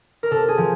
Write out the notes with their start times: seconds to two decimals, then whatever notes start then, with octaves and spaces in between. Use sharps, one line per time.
0.23 A#4
0.31 C3 A4
0.49 G#4
0.58 F3